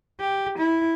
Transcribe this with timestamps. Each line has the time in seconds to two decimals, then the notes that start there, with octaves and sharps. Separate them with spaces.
0.20 G4
0.58 E4